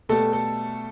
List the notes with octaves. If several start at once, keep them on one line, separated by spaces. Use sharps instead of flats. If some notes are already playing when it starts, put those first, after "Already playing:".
B2 G3 A3 A4
A4